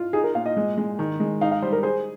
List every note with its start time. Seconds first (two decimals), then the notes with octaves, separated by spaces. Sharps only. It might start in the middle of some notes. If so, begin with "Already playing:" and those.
Already playing: F4
0.13 D#4 G#4
0.24 A#4
0.35 A#2 F5
0.46 D#5
0.57 G#3
0.78 G#3
0.99 D#3
1.20 G#3
1.41 D#4 F5
1.51 F5
1.62 G3 C5
1.73 A#4
1.83 G#4 C5